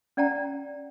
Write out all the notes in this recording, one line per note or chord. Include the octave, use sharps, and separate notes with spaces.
C#4 D5 F#5 G5 A#5